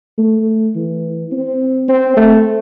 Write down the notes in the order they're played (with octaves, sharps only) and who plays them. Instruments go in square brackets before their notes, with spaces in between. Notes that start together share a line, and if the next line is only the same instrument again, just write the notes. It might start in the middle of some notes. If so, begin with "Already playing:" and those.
[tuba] A3
E3
C4
C4
A3